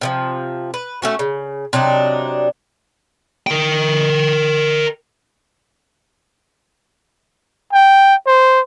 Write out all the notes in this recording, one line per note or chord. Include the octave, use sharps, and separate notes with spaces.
C3 D#3 F3
B4
A3 C#4 F#4
C#3
C3 F#3 D4 D#4
A#4 G5
G5
C5